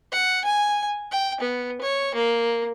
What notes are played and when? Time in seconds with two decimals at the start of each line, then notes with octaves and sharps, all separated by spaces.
0.12 F#5
0.45 G#5
1.11 G5
1.41 B3
1.82 C#5
2.15 A#3